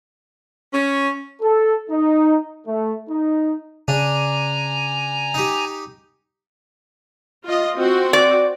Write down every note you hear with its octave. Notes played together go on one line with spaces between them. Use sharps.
C#4
A4
D#4
A3
D#4
C#3 D4 G#5 A#5
D#4 G4
F4 D#5
C4 F#4
D5